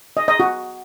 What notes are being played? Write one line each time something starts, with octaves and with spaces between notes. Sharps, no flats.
D#5
D#5
F#4